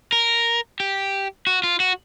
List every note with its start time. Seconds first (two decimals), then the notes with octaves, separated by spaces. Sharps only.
0.13 A#4
0.80 G4
1.47 F#4
1.63 F4
1.80 F#4